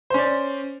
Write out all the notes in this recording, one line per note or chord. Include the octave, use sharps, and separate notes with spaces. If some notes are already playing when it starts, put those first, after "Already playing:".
C#4 C5 D5